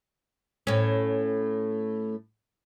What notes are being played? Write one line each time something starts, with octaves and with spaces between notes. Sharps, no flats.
A2 C#4